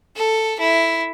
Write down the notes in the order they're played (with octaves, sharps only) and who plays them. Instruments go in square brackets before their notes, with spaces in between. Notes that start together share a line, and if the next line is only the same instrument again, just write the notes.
[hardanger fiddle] A4
E4